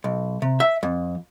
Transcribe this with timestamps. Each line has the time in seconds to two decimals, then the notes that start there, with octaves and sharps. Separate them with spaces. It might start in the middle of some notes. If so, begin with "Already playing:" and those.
0.04 B1
0.42 C3
0.60 E5
0.83 F2